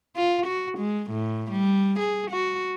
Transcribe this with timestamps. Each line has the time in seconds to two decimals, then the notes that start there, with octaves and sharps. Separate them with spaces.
0.16 F4
0.46 F#4
0.78 G#3
1.11 A2
1.51 G3
1.99 G#4
2.31 F#4